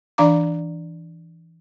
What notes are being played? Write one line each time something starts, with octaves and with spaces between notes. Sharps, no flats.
E3 D4 D5 F5 A#5 D6